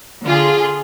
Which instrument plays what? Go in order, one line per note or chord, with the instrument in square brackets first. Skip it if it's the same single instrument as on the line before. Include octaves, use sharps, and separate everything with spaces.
[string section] D3 F4 G#4